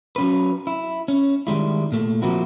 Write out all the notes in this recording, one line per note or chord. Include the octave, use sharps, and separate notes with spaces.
F#3 C#4 B4
E4
C#4
D#3 G3 G#3 E4
A#2 A3
F3 A#3 C4 E4 F#4